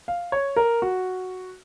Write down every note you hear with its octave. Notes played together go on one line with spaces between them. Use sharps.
F5
C#5
A#4
F#4